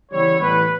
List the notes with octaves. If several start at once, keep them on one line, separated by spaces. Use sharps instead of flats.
C#3 E3 G3 B3 E4 C#5
A2 E3 G3 B3 B4